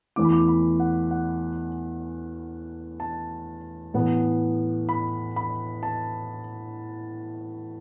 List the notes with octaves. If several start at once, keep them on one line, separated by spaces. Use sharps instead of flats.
E2 E3 A3 E4 D6
B5
D6
B5
F#5
F#5
A5
A2 E3 B3
B5
B5
A5